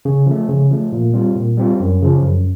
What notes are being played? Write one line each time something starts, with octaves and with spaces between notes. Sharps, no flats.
C#3
F3 A3
C#3
F3 A3
A#2
G3 C4 F4
A#2
G3 C4 F4
F#2
C#3 F3
F#2